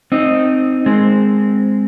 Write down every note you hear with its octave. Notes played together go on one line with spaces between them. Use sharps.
C4 D#4
G#3 C4